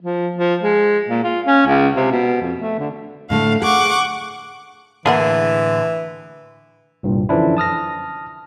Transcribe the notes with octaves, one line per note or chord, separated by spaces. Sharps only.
F3
F3
G#3
A#2
F4
C#4
C#2
C3
B2
F2
A3
D3
A2 D3 A3 F5
G#4 F#5 C#6 D6
A2 D3 E3 A#3 G#4 A#4 F#5
C2 G2 A#2
F#2 D3 E3 F3 D4 E4
A5 D#6 F6 A#6